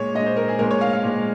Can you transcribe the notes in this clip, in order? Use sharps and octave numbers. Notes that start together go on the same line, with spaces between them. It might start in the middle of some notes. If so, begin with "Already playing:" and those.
Already playing: A#2 G#3 C#5
A#2 G#3 D#5
C5
A#4
G#4
A#2 G#3 A#4
C#5
F5
F5
A#2 G#3